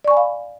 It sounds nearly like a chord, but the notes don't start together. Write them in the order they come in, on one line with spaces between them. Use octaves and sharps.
D5 C#6 G#5 B5 F5